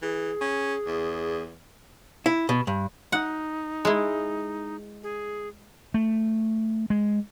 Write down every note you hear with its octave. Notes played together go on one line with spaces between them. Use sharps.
E3 G#4
C#4
E2
E4
B2
G2
D#4 F#5
G#3 E4
G#4
A3
G#3